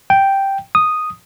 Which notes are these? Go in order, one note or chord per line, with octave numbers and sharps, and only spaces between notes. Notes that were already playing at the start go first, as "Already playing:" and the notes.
G5
D#6